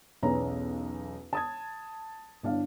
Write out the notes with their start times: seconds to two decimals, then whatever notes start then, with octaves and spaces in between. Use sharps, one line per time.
0.23 B1 E2 C#4 B4 A#5
1.33 A5 D#6 G#6
2.43 G1 D4 E4 F5